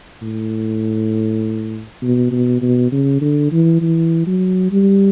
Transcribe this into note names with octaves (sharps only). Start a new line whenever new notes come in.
A2
B2
B2
B2
C#3
D3
E3
E3
F#3
G3